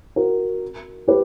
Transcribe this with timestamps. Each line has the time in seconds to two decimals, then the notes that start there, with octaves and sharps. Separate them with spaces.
0.16 F#4 A#4
1.08 G4 B4